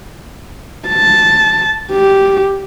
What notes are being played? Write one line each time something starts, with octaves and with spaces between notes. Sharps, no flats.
A5
G4